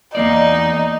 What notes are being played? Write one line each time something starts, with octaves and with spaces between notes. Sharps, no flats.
E2 A#3 D#4 D5